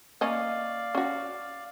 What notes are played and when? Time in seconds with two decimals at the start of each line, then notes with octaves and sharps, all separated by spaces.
0.21 A#3 C#4 D5 D#5 F5
0.95 C#4 F#4